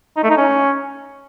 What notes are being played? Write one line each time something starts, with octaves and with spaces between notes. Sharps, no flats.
D#4
A3
D#4
C#4